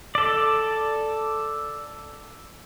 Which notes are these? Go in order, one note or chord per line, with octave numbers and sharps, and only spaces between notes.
A4 D5